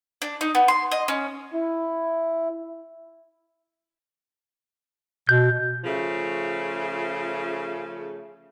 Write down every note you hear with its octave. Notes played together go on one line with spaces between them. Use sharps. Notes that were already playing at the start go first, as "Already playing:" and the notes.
D4
D#4
B3
C6
D#5
C#4
E4
B2 G6
C#3 F3 A3